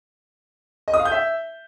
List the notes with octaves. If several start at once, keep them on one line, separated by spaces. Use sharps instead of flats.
D#5
D#6
F5
G6
E5